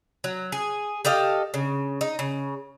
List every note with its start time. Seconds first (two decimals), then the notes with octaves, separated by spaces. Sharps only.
0.24 F#3
0.52 G#4
1.05 G4 A4 D#5 F5
1.54 C#3
2.01 D#4
2.19 C#3